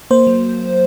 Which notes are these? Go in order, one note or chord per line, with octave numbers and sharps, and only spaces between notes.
A#3 C5
F#3